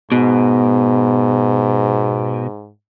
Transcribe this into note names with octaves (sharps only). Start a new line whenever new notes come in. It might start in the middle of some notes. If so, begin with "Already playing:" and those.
G#2 B2